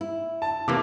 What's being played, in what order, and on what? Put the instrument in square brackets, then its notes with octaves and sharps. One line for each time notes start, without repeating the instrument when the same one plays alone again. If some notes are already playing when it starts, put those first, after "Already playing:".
[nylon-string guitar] E4
[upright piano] A5
[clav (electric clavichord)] C3 E3 A#3 [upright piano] A5 D6